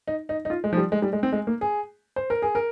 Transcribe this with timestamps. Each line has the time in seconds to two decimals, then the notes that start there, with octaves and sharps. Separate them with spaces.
0.08 D#4
0.29 D#4
0.45 D#4
0.50 F4
0.64 G#3
0.73 F3
0.77 G3
0.92 G#3
1.02 G3
1.13 G#3
1.23 C4
1.32 G#3
1.47 A#3
1.61 G#4
2.16 C5
2.30 A#4
2.42 G#4
2.55 A#4